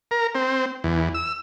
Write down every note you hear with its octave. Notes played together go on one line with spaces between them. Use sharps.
A#4
C4
E2
E6